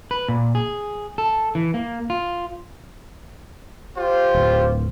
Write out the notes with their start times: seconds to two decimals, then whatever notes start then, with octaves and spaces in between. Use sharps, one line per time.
0.11 B4
0.28 A#2
0.55 G#4
1.18 A4
1.55 E3
1.74 A#3
2.10 F4
3.98 F4 G4 C5
4.35 D1